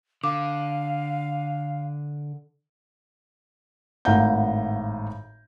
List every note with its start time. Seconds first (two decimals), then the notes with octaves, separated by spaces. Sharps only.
0.24 D3 F5 D6
4.05 G#1 A2 F5 F#5 A#5 G6